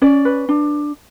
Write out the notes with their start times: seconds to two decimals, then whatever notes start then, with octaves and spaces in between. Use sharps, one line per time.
0.02 C#4 D5
0.25 B4
0.49 D4